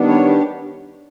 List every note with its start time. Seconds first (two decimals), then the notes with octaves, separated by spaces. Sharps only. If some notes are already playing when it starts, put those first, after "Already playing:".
Already playing: D#3 G3 B3 D4
0.08 C#5
0.25 G4